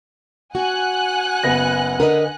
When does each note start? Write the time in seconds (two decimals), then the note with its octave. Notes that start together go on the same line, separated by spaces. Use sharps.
0.55 F#4 F#5 G#5 F#6
1.43 F#1 B3 A#6
2.00 D3 A#4 B4 D#5